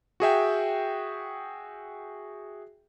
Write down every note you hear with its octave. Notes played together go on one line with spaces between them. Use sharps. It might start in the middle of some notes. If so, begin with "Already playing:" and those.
F#4 G#4 E5 G5